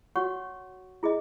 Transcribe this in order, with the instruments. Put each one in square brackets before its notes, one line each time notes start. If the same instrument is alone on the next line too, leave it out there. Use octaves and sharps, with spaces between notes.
[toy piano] F#4 C#5 F#5 C#6
E4 G#4 D#5